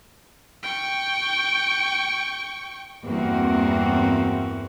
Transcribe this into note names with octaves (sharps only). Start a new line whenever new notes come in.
G5 C#6
E2 G2 A#3 C4 F#4